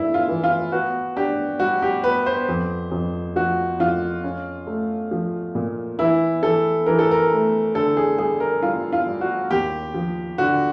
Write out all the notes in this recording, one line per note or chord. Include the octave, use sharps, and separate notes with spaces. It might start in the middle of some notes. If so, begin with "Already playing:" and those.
Already playing: G2 E3 A3 E4
F4
E3
F4
B3 F#4
D4 G4
G3 F#4
G4
B3 B4
C5
F2
F2
F3 F#4
F2 F4
C#4
A3
F3
A#2
E3 E4
E3 A4
E3 A#4
A4
A#4
A3
D3 A4
G#4
G3 G#4
A#4
G3 F4
F4
G3
F#4
D#2 G4
F3
D3 F#4